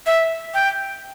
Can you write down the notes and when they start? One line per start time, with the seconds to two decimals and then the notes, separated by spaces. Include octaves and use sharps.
0.06 E5
0.54 G5